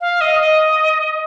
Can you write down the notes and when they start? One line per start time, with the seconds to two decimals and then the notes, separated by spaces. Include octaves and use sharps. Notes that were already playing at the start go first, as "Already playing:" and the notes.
0.01 F5
0.21 D#5
0.40 D#5